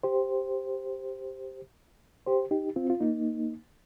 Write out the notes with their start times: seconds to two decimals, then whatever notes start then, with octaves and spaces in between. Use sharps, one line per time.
0.03 G4 C5
2.26 G4 C5
2.51 D#4 G4
2.76 C4 F4
2.90 F4
3.01 A#3 D#4